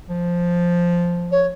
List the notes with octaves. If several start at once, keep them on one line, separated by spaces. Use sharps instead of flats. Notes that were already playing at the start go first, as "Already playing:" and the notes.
F3
C#5